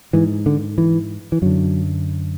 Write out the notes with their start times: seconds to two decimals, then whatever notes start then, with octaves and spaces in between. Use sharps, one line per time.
0.13 G#2 E3
0.46 D3
0.78 E3
1.32 E3
1.42 F#2 D3 F#3